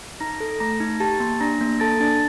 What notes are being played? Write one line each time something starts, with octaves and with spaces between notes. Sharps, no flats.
D#4 A#5 A#6
A4
A3 A#5 A#6
D#4
G4 A5 A6
A#3
D4 A#5 A#6
A#3
A4 A5 A6
D4 A5 A6